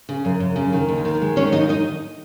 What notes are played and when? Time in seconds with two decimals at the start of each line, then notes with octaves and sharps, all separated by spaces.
0.09 C#3
0.25 F#2
0.40 F#2
0.56 C#3
0.73 D#3
0.89 D#2
1.05 D#3
1.21 G#3
1.36 D#3 C#4 C#5
1.52 D#2 D#4 D#5
1.69 D#4 D#5